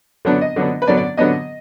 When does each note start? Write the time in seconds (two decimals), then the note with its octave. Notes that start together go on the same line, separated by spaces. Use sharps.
0.25 D3 F#3 B3 D4
0.41 D#5
0.56 D3 F#3 B3 D4
0.82 B4
0.87 D3 F#3 B3 D4 D5
0.97 D5
1.17 D3 F#3 B3 D4 D#5